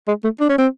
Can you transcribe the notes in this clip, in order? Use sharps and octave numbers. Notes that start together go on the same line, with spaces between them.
G#3
A3
D4
C#4
C4